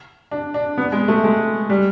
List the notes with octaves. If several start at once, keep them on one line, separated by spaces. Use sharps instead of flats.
D4
D4
B3
G#3
A3
G#3
G3